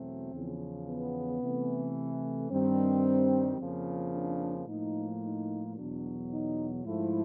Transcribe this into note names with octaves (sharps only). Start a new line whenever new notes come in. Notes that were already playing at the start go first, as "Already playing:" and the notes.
Already playing: E2 B2 F#3 A3 C4
E2 C#3 F3
B3
C3 E3 A3
G2 D#3 G3 C4
F2 C#3 F3 A#3
D4
A2 F3 A#3 D#4
D#4
E2 B2 F#3 D4
D#4
G#2 F3 A3 E4